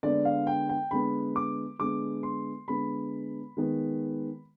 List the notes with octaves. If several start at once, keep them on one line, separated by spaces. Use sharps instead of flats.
D3 G#3 B3 D5
F5
G5
G5
D3 G#3 B3 B5
D6
D3 G#3 B3 D6
C6
D3 G#3 B3 B5
D#3 G#3 B3